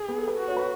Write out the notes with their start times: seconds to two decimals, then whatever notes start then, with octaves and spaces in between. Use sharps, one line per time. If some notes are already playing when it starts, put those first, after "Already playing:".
Already playing: G#4
0.09 B3
0.18 A4
0.28 B4
0.38 F#4
0.48 C#5
0.57 B4